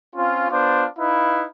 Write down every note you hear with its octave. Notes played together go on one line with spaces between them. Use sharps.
C4 C#4 F4
B3 D4 F4 C5
D#4 E4 B4 F5